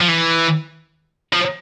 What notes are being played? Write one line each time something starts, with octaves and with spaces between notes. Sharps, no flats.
F3
E3
F3